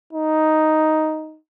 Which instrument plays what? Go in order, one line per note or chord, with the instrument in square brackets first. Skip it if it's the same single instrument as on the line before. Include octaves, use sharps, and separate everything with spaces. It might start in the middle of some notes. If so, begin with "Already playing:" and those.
[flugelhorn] D#4